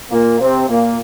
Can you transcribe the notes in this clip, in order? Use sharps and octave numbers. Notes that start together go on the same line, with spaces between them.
A#2 A#3
C3 C4
A#2 A#3